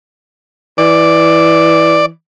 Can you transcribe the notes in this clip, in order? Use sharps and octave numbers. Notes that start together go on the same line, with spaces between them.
E3 D5